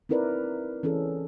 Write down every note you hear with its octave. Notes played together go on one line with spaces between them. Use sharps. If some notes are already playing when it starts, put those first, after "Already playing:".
C4 D#4 E4 A#4 B4 D5
E3 C#4 G#4 A4